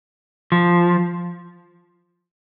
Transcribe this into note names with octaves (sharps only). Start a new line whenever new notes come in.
F3